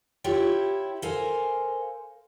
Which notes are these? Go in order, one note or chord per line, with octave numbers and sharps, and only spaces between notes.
E4 F4 G4 C#5 G5
A4 A#4 C5 F5 G#5